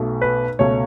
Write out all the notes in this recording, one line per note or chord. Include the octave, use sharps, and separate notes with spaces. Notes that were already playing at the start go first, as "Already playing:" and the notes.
Already playing: B1 B2 A3
B4
C#2 B2 A3 C#5